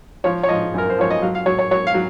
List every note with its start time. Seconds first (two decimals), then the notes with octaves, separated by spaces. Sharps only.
0.24 F3 C#5
0.43 C#5
0.49 F3 D#5
0.74 F#2 A#4
0.90 C5
0.98 F3 C#5
1.11 D#5
1.22 F#3 F5
1.35 F5
1.46 F#3 C#5
1.59 C#5
1.71 F#3 C#5
1.87 F5
1.94 F#3